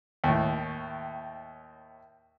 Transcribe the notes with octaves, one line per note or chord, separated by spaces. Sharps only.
D#2 A2